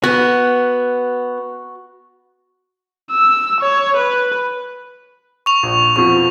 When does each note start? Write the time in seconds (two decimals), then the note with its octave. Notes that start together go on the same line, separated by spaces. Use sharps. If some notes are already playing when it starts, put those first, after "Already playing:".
0.04 B3 F#4
3.11 E6
3.61 C#5
3.97 B4
5.46 C#6 F7
5.63 A#1
5.96 F2 B2 F3 C#6